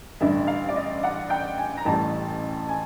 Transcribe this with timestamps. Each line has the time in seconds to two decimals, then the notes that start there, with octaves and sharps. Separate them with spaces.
0.20 A1 G2 D3 E5
0.47 F5
0.69 D5
0.76 D#5
1.03 F#5
1.30 G5
1.58 G#5
1.77 A#5
1.85 A1 A2 E3 G3 A5
2.69 G#5